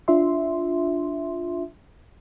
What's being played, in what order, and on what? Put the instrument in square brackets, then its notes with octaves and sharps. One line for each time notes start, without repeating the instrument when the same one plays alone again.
[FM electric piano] D4 F4 E5 C6